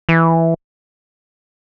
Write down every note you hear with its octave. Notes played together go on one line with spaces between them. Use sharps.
E3